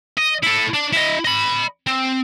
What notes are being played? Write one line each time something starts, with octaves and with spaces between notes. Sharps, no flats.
D#5
E4 A4
D4
E4 D#5
D#5 B5
C4